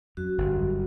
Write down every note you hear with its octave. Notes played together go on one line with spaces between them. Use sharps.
F#2 F#4
G1
F#2